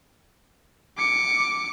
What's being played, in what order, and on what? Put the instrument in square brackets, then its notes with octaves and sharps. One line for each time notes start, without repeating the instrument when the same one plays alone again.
[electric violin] D6 C#7